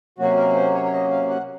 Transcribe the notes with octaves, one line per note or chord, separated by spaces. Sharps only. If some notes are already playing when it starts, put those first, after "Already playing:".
C3 F#3 A#3 C#4 F#4
A#4
C5
C#5
C#5
D#5
F5
F#5